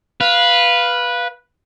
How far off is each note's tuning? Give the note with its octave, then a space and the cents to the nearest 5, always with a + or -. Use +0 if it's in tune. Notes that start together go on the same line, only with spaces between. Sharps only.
B4 -10 F5 +0